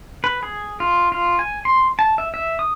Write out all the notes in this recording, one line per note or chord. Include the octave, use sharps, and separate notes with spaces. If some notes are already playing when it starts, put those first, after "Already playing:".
B4
G#4
F4
F4
G#5
C6
A5
E5
E5
D#6